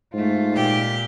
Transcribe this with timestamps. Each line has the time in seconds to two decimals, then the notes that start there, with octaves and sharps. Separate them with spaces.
0.14 G#2 A3 F4
0.53 A#2 G4